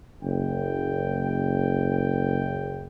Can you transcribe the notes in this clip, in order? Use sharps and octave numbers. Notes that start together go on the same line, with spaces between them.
F#1 G5